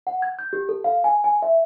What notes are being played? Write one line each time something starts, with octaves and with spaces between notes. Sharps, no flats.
F#5
G#6
G6
G4
A4
F5
G#5
G#5
E5